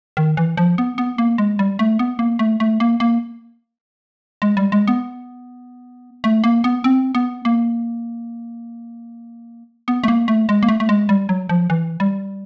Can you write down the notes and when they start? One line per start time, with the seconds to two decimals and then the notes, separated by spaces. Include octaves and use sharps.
0.17 D#3
0.37 E3
0.57 F3
0.78 B3
0.98 B3
1.18 A#3
1.38 G#3
1.59 G3
1.79 A3
1.99 B3
2.19 A#3
2.39 A3
2.60 A3
2.80 A#3
3.00 A#3
4.42 G#3
4.57 G3
4.72 G#3
4.88 B3
6.24 A3
6.44 A#3
6.64 B3
6.84 C4
7.15 B3
7.45 A#3
9.88 B3
10.04 A3
10.08 A#3
10.28 A3
10.49 G#3
10.63 A#3
10.68 A3
10.80 A3
10.89 G#3
11.09 G3
11.29 F#3
11.49 F3
11.70 E3
12.00 G3